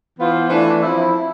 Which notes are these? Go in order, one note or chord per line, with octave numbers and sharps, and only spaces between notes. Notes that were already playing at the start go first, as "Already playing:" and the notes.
E3 B3 F4 C5
E3 A3 D4
F3 C4 E4